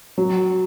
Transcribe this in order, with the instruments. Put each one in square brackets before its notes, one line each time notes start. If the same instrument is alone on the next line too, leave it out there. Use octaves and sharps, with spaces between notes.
[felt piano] F#3